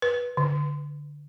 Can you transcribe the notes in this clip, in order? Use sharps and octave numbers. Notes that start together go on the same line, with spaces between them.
B4
D3